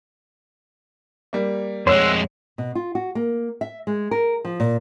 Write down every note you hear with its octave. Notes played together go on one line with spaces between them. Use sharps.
G3 A#3
F2 G#3 C5 C#5 E5 F#5
B2
F4
F#4
A#3
E5
G#3
A#4
F3
A#2